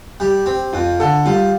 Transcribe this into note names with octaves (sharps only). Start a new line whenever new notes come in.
G3 G4
C4 G4
F2 F4
D3 A4
G3 F4